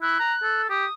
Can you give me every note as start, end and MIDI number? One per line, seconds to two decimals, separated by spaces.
0.02 0.18 64
0.02 0.62 90
0.19 0.34 82
0.43 0.68 69
0.70 0.85 67
0.70 0.93 87